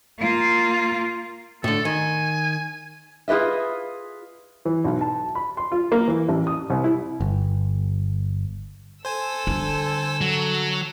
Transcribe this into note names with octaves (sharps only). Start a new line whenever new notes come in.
A#3 F4
A2 D3 A4
D#3 G#5
F4 G#4 B4 D#5 E5
E3
B1
A5
B5
C6
F4
A#3
E3
A1
D#6
C2
E4
G1
A4 C5 G#5 E6
D3 G3
F#3